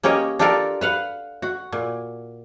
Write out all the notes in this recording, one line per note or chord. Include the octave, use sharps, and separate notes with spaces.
A#3 C#4 G4 C#5 D#5
D4 F4 G4 A4 A#4 D5
B4 F5 F#5
F#4
A#2